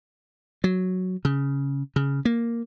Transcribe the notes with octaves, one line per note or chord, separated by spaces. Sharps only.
F#3
C#3
C#3
A#3